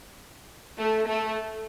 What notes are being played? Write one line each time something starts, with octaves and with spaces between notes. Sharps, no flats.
A3
A3